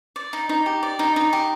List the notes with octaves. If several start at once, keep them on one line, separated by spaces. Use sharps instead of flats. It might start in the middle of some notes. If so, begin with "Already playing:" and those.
D5
D#4
D#4
G4
D5
D#4
D#4
G4